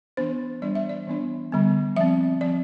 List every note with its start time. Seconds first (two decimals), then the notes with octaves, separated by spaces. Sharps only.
0.17 E3 B3 D4 C5
0.62 E3 G3 B3 D4 D5
0.75 E5
0.89 D5
1.07 E3 B3 D4
1.52 D3 G3 B3
1.96 F3 C4 E5
2.41 F3 C4 D5